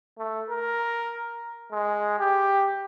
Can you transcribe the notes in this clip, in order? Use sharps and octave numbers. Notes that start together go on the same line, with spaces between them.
A3
A#4
G#3
G4